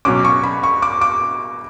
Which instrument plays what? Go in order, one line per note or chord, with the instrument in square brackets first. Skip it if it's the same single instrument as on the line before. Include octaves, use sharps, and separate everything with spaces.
[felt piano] B2 F#3 C#4 D6
C#6
B5
C#6
D6
D6